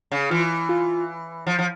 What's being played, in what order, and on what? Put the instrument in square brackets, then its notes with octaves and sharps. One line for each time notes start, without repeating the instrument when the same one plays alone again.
[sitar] C#3
[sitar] E3 [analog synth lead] F4
[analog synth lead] F4
[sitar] F3
F3